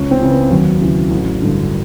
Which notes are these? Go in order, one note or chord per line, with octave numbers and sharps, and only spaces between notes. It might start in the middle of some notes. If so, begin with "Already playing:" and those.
Already playing: C#2 C#4
C4
C#3 E3
B3
D#2 F#3
C#3 E3
A1
G2 D3